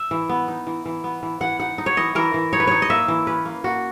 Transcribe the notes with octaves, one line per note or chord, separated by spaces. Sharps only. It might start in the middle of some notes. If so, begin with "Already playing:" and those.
Already playing: E5
E3
B3
D#4
E3
E3
B3
E3
E3 F#5
D#4 F#5
D#4
C#5
E3 D#5
E3 A#4
E3
D#4 C#5
B4
D#4 C#5
D#5
A#3 E5
E3
C#4 B4
A#3
A#3 F#4